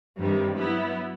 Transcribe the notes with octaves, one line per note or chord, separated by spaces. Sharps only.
G2 C3 D#3 G3
F#3 B3 E4